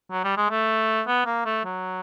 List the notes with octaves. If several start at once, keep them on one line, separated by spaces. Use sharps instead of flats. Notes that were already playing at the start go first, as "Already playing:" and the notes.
F#3
G3
G#3
A3
B3
A#3
A3
F#3